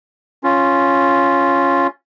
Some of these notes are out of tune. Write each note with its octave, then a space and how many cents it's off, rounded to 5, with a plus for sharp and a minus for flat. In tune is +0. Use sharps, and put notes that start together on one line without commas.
C#4 +0 F4 +0